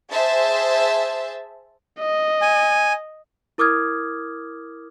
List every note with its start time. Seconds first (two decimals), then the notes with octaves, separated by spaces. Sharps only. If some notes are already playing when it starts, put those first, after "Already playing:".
0.11 G#4 C5 E5 A5
1.99 D#5
2.42 G#5
3.58 E4 A#4 D6 D#6 F6 G#6